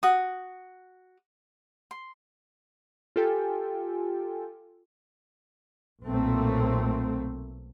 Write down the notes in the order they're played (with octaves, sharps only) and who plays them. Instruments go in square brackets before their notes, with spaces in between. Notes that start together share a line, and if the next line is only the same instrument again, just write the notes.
[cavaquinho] F#4 D#6
C6
[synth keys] F4 G4 A4 G5 G#5
[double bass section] B1 A#2 A3 A#3 C4